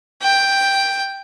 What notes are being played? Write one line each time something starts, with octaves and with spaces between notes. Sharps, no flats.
G5